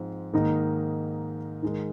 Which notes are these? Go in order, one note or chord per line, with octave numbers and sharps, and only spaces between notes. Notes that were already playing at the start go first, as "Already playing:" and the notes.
Already playing: G#2 F3 C4
G#2 D#3 A#3 D#4 A#4
G#2 D#3 G#3 D#4 A#4